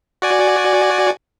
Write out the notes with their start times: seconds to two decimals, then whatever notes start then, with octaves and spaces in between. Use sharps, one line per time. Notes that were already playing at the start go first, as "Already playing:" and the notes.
0.22 F#4 D5 G#5